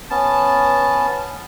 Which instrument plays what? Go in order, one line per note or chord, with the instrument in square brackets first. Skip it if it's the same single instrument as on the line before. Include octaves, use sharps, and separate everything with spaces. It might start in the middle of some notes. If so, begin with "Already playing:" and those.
[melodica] B3 C#4 A5